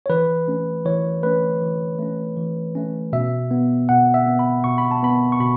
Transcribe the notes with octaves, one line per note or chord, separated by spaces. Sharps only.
C#5
E3 B4
A3 C#4
E3 C#5
A3 C#4 B4
E3
A3 C#4
E3
A3 C#4
B2 E5
B3
B2 F#5
E5
B3
B5
B2 C#6
B5
A5
B3 B5
C#6
B2 B5